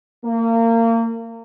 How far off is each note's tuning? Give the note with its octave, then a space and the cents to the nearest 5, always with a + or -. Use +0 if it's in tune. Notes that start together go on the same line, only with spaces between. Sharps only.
A#3 -30